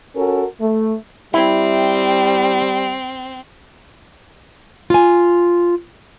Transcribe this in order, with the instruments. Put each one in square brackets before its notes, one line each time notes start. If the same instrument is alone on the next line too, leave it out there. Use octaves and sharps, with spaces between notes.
[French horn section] C#4 F#4 A4 A#4
A3
[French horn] G3 [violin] C4 [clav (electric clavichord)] E4
[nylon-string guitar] F4 G#5